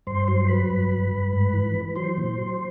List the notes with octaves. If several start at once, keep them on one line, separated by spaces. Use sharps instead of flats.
G2 C5 C6
F#3 C5 C6
F#3 B4 B5
G2
G2
G2
G#2
E3
E3
F#3 C5 C6
A#2
F#3